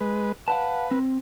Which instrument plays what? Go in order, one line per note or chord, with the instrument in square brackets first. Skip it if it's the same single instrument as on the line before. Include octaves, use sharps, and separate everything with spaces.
[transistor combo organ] G#3 B4
[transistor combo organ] B4 [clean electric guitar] F5 F#5 A5
[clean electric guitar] C4